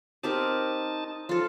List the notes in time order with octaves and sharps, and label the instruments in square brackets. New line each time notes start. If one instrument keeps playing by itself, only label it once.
[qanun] C4 G4 A#4 [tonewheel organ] D#4 A5
[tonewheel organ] F3 [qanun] F4 A4